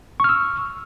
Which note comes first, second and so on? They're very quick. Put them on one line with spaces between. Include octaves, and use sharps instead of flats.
C#6 F6 E6